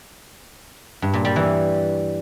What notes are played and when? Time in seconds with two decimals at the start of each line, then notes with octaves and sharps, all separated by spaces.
1.02 G2
1.14 A#2
1.25 G3
1.36 E3